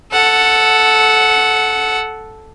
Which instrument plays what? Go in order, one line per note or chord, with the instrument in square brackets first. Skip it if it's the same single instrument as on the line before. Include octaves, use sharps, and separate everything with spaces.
[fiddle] A4 F#5